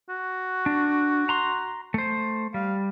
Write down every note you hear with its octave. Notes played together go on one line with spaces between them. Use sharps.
F#4
D4
A#5 C6
A3 C5
G3 F5